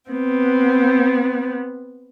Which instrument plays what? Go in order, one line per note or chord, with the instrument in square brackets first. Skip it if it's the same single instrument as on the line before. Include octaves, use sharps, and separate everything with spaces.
[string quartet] B3 C4